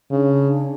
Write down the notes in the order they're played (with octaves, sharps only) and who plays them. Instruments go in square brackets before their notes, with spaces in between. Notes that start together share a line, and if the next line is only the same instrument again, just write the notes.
[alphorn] C#3 [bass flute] D4